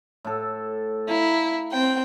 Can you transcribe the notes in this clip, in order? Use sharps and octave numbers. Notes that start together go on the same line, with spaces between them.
A2 A4
E4 F5 A#5
C4 G5